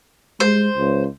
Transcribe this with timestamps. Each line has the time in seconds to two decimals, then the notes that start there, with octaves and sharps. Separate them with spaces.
0.40 G#3 C5
0.77 C#2